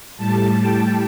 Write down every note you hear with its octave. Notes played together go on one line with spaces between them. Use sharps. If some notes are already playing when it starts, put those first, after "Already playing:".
A2 G3 A5
G5